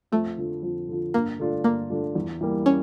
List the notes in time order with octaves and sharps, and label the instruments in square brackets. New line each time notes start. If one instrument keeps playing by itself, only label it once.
[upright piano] F2 [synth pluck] A3
[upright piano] D3 F3
F2
D3 F3
[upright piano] G2 [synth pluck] A#3
[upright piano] D3 A3 D4 F4
[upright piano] G2 [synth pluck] A#3
[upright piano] D3 A3 D4 F4
E2
E3 G3 A#3
[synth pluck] C#4